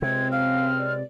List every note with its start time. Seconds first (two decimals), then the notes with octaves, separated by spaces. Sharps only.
0.02 C#2 C3 G#3 C4 G#6
0.32 F5 F6
0.79 D5